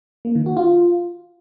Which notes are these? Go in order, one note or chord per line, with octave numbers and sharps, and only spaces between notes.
A#3
D#3
F#4
F4